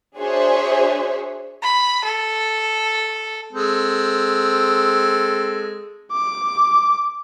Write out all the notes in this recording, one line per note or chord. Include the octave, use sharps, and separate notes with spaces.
D4 F#4 G#4 C5 C#5 E5
B5
A4
G#3 C4 A4
D6